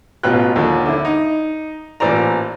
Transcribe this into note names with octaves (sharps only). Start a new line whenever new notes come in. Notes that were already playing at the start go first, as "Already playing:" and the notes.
A1 B2 B3 F4 G5 F#6
D#2 D3 F3
D3 E4
D#4
A1 A#2 E3 C5 D5 A#5